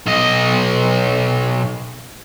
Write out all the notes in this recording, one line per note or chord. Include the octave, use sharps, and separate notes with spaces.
B1 D#5